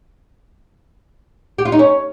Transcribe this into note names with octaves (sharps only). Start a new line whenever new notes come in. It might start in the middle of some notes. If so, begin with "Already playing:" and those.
G4
F4
D#4
C#4